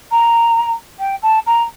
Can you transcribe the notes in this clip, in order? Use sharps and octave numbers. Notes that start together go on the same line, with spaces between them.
A#5
G5
A5
A#5